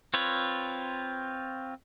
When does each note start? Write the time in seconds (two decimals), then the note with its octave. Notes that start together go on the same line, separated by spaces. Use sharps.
0.14 C4 F4 B4 C#5